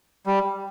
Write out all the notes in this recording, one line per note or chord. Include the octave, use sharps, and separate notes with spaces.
G3